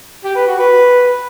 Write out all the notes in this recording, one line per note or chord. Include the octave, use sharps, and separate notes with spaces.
G4
B4
F#4
B4